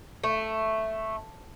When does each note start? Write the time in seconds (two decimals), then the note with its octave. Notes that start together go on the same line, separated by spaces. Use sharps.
0.24 A3